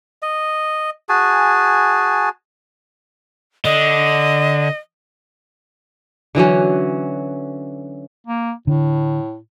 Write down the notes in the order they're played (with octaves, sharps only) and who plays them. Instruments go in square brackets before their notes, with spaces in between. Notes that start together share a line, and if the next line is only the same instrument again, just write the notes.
[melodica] D#5
F#4 G#4 G#5 A5
[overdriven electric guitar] D3 [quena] D#5
[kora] D3 E3 F#3 C#4
[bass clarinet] A#3
[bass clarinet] A2 [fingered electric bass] D3